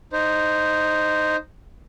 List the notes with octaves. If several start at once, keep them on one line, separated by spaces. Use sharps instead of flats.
D#4 C5